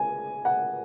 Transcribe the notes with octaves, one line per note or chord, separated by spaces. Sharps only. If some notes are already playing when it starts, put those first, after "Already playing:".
Already playing: G#5
F#5